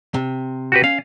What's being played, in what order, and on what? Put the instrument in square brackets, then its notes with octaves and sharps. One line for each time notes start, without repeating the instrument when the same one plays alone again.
[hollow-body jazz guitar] C3
[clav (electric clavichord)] F#4 G4 B4
[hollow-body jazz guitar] C#4 [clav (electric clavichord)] F5